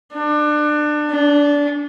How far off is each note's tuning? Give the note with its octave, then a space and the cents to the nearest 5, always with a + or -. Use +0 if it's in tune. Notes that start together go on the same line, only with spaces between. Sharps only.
D4 +25
D4 -20